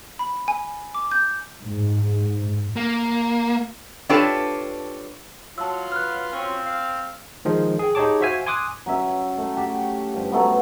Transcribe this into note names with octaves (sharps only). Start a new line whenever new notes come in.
B5
G#5
D6
G6
G#2
A#3
D4 F4 G4 A4 B4 C#5
F#3 F4 A5 E6
B4 F6 F#6
F#3 C4 C#4
F5
D#3 F3 G#3
G#4 G5
D#4 G4 G#4 C#5 A5 D6
F#4 C5 E5 F5 G#5
G#5 C6 D6 D#6 F#6
F#3 C#4 E5
A3
G4 F#5 A5
G2 F3
F#3 A3 B3